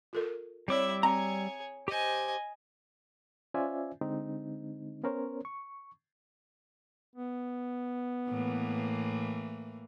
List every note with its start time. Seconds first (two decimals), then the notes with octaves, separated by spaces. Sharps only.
0.13 F4 A4 A#4
0.68 G3 C4 E4 C#5 D5 E5 D6 E6
1.03 C4 G#4 C#5 A#5
1.88 G4 C5 D#5 G#5
3.54 C#4 F4 C5 D5 E5 G#5
4.01 D3 G#3 C4 D#4
5.04 B3 C#4 A#4 C5 C#5
5.45 C#6
7.15 B3
8.29 A2 E3 A#3